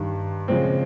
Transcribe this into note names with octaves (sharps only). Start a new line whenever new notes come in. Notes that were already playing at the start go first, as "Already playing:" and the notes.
Already playing: G2 D#3 G3
C#3 F3 G#3 C4